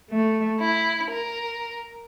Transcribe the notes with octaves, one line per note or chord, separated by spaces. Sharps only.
A3
E4
A#4